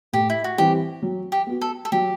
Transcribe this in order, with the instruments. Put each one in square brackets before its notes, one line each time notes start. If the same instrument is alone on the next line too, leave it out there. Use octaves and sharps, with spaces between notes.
[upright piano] A2 [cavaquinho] G4
[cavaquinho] E4
F#4
[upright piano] E3 G3 C4 E4 [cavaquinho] G4
[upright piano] F#3
[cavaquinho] G4
[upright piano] B3 F#4
[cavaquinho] A4
A4
[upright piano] F#3 [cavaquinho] G4